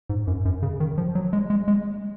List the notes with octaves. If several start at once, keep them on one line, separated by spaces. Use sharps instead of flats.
G#2
F#2
F#2
C#3
D#3
F3
F#3
G#3
G#3
G#3